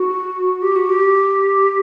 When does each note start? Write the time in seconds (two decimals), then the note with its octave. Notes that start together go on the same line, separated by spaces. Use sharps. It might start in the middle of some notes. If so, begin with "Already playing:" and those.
Already playing: F#4
0.62 G4
0.76 F#4
0.89 G4